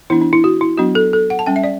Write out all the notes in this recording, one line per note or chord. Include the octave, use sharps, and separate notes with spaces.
E3 B3 D4 E4
D4
E4
F#4
E4
F#3 B3 D4 F#4
A4
A4
F#5
A5
G3 C#4 G5
E5
D5